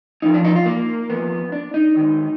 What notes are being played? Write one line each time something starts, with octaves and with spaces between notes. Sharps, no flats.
F#2 F3 D#4
D4
D#4
F4
A#3
F2 F3 B3
D4
D#4
G#2 D#3 F#3